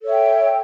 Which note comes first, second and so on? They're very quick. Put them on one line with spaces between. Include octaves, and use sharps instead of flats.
A4 C#5 E5 G5